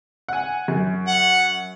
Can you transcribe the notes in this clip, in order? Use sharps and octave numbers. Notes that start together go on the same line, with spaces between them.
F#5 G#5
F#2
F#5